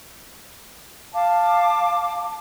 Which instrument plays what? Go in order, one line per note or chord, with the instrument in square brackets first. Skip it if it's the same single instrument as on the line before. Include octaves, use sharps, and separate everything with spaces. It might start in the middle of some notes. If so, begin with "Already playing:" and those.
[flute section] F5 A5 D6